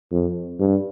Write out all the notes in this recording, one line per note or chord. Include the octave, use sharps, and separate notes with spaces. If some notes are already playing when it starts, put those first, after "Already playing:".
F2
G2